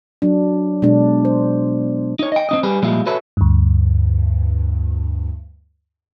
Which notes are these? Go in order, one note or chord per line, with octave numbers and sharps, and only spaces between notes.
F#3 D4
B2 G#3 D4
C5
D#4 C#5
D#5 G5
C4 D4 D#5
G3 G#4 B4
A#2 F3 G3 G#3 E4 F4
F#4 G#4 A4 B4 C#5 E5
D2 G2